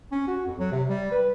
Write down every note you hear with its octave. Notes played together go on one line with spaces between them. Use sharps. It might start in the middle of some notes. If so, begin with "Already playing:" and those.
C#4
F#4
F2
F#3
C3
G3
B4